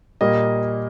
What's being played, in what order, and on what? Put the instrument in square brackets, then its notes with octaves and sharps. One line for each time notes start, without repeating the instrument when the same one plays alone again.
[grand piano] A#2 G3 A#3 D#5